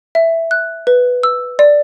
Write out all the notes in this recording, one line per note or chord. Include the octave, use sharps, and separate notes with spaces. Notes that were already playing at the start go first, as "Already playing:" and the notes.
E5
F#6
B4
E6
D5